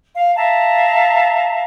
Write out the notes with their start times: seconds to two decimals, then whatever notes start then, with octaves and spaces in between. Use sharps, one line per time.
0.17 F5
0.36 E5 F5 A5 A#5